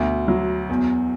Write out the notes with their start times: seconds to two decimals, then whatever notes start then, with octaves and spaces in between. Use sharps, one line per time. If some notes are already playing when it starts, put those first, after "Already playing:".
Already playing: D2 B2
0.28 F#3
0.69 E2